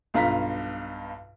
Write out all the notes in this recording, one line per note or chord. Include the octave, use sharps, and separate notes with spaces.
B1 G2 F4 F5 A#5 B6